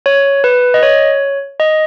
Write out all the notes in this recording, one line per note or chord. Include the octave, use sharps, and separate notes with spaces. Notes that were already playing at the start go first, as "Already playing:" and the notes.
C#5
B4
D#5
C#5
D#5